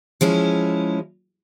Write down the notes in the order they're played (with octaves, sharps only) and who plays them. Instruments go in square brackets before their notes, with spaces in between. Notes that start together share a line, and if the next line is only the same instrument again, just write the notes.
[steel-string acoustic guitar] F3 G#3 C#4 E4